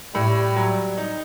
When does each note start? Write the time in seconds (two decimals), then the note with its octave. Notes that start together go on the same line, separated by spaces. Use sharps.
0.15 A2 G3
0.56 F#3
0.98 D#4